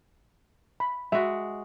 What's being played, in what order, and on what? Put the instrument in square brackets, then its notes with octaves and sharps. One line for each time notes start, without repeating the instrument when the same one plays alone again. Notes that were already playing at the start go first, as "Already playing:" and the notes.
[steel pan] B5
[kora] G#3 F#4 [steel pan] E5